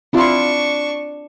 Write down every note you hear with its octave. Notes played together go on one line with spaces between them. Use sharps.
C4 D4 E4 F4 C#6